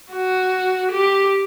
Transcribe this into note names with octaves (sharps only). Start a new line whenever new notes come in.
F#4
G4